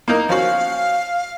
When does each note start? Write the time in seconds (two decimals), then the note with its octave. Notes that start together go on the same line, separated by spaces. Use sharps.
0.08 A#3 D#4 A#4
0.29 F3 C#4 F#4 F5